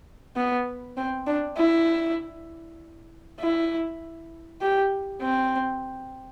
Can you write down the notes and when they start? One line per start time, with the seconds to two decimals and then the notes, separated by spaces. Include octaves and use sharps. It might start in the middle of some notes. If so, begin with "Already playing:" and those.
0.36 B3
0.97 C4
1.27 D4
1.57 E4
3.40 E4
4.61 G4
5.21 C4